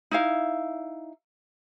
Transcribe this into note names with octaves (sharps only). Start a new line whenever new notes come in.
D#4 E4 F5